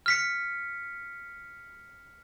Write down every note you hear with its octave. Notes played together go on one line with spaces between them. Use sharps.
F6 B6 C#7